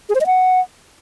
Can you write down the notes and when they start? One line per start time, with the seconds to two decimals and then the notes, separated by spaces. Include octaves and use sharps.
0.09 G#4
0.15 C5
0.21 D#5
0.26 F#5